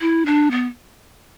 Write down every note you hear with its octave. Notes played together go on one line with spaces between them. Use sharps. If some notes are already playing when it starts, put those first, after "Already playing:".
E4
D4
B3